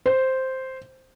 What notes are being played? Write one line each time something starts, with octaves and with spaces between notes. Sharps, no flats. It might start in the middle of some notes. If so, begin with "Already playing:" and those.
C5